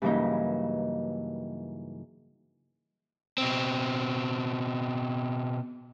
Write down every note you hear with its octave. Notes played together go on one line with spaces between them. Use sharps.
G2 C#3 E3 F#3 A#3 D#4
B2 C4